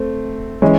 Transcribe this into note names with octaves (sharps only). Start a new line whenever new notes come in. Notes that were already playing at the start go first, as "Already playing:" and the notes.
Already playing: A3 C4
E3 G#3 C#4